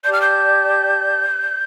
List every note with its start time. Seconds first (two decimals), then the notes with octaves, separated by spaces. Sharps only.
0.04 G4 D5 A5 G6
0.13 F6
0.22 G6